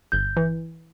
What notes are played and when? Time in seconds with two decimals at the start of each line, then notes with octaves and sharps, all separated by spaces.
0.12 G1 G6
0.37 E3